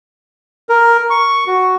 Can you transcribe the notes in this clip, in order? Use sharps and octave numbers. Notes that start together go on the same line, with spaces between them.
A#4
C#6
F#4